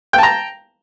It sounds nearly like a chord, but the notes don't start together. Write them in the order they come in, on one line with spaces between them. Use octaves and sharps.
G5 A5 A#5